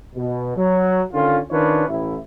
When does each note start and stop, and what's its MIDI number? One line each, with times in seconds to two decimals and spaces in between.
0.15 0.53 47
0.56 1.01 54
1.13 1.38 50
1.13 1.38 51
1.13 1.38 61
1.13 1.38 65
1.50 1.85 51
1.50 1.85 61
1.50 1.85 62
1.50 1.85 65
1.50 1.85 71
1.50 1.85 73
1.89 2.16 33
1.89 2.16 64